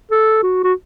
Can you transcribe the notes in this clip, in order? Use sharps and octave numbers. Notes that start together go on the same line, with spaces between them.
A4
F#4
F#4